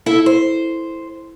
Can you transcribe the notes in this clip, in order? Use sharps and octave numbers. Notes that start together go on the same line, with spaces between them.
E4 A4 E5
C5